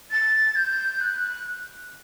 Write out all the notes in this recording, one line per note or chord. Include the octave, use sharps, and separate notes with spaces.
A6
G6
F#6